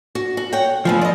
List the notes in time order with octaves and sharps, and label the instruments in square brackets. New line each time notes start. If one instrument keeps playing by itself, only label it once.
[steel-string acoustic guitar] F#4
F#4
C#5 F#5 G5
[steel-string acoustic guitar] C#3 A3 B3 [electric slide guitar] F3
[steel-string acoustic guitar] D5 D#5